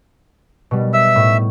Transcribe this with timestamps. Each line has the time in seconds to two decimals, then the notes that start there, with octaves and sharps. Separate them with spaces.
0.71 B2 G3
0.94 E5 E6
1.15 A2